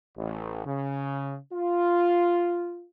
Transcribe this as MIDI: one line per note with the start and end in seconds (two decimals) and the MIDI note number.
0.17 0.63 33
0.66 1.36 49
1.53 2.86 65